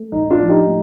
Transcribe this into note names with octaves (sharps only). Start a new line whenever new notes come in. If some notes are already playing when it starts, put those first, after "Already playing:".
Already playing: A3
A1 D#4
D4 F4
F3
D#4 G4
A2